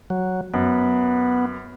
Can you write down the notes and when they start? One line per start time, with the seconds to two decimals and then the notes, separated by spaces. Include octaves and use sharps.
0.10 F#3
0.54 F#2 B3